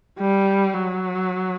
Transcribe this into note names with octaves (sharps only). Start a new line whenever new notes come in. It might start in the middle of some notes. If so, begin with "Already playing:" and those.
G3
F#3